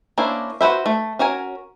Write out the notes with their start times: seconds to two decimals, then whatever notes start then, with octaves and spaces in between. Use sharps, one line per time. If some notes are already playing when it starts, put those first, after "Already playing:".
0.18 A#3 C#4 D4 E4 C5
0.61 F#4 B4 C5 E5
0.86 A3
1.19 C#4 F#4 A#4 G#5